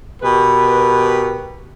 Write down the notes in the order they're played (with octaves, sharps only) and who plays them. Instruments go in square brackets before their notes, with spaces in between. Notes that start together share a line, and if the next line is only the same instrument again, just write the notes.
[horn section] B2 G4 A#4 B4